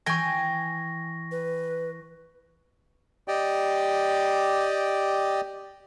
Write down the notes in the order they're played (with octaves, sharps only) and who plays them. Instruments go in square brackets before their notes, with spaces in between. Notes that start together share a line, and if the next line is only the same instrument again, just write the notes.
[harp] E3 [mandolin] G5 G#5 [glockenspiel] C#6 A#6
[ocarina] B4
[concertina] G4 D5 D#5 G5